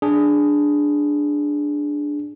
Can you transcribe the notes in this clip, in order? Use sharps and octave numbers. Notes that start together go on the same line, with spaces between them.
D4 G#4